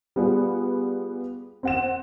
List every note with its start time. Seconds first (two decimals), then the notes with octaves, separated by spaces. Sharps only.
0.16 G3 B3 F4 G#4
1.63 C4 F#5 E7